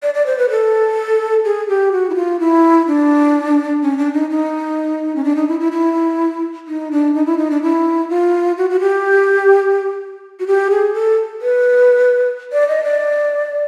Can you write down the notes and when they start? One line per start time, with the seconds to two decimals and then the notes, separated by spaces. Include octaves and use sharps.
0.03 D5
0.14 D5
0.26 C5
0.38 B4
0.50 A4
1.45 G#4
1.68 G4
1.92 F#4
2.10 E4
2.15 F4
2.40 E4
2.87 D4
3.83 C#4
3.98 D4
4.14 D#4
4.30 D#4
5.16 C#4
5.24 D4
5.36 D#4
5.48 E4
5.60 E4
5.72 E4
6.68 D#4
6.91 D4
7.14 D#4
7.26 E4
7.38 D#4
7.50 D4
7.62 E4
8.10 F4
8.58 F#4
8.70 F#4
8.80 G4
10.40 F#4
10.47 G4
10.70 G#4
10.94 A4
11.42 B4
12.52 D5
12.69 D#5
12.84 D5